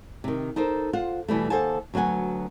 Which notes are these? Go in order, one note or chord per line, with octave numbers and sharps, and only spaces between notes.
C3 D#3
D#4 A4 A#4 C5
F4 C5 F#5
B2 E3 G3 A3
D#2 A4 C5 F#5 G#5 A5
D2 F#3 B3 F#5 G#5